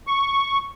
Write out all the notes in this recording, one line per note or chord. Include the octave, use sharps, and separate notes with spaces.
C#6